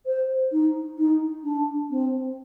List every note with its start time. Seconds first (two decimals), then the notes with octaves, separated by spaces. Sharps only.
0.06 C5
0.52 D#4
0.98 D#4
1.44 D4
1.90 C4